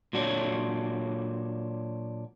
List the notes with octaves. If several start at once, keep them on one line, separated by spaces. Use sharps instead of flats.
A#2 F#3 D4 C#5